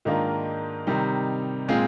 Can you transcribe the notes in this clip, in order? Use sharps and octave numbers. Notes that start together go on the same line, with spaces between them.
G#2 D#3 A#3 D4 F4
C3 D#3 G3 C4 D#4
A#2 G#3 C4 F4 G#4